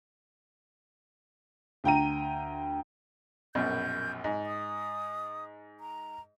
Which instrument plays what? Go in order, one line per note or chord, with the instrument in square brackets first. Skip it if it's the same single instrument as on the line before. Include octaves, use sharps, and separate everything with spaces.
[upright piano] D2 G5 A#5 D#7
[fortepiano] A#1 F#2 B2 [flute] G6
[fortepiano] G#2
[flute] D#6
A#5